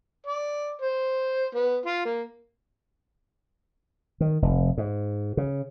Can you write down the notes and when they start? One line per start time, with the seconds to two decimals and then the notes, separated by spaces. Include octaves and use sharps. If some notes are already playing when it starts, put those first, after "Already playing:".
0.27 D5
0.82 C5
1.55 B3
1.86 F4
2.05 A#3
4.20 D#3
4.42 F1
4.78 G#2
5.37 C#3